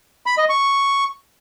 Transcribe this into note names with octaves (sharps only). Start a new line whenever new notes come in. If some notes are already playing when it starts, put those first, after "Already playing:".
B5
D#5
C#6